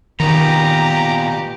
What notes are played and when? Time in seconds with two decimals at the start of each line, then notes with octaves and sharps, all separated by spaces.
0.20 A#2 D#3 B3 G4 A#5